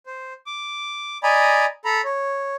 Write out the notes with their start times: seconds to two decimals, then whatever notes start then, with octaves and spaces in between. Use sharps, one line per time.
0.06 C5
0.46 D6
1.23 D5 D#5 G#5 A#5 B5
1.85 A4 A#5 B5
2.04 C#5